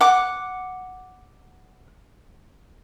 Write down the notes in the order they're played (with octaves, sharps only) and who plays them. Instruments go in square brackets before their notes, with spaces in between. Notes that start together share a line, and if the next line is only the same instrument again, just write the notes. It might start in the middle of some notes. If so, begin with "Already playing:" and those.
[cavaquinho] F#5 D6